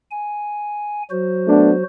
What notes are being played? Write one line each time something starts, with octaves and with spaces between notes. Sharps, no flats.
G#5
F#3 F#4 C5
A3 B3 D4